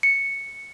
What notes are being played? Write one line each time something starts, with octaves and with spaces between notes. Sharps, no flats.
C#7